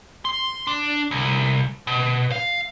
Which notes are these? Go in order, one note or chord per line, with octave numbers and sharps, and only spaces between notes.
C6
D4
C2
B2
F5